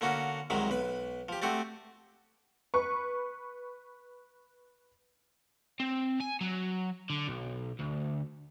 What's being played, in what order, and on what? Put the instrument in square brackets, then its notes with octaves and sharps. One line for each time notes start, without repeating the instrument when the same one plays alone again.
[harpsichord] D3 A#3 C#4 F#4
C2 D#3 F#3 G#3 B5
B1 B4 B5
F3 G4
A3 C4 F#4 G4 D5
[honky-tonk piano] B4 C#6
[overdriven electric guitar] C4
G#5
F#3
D3
B1
D2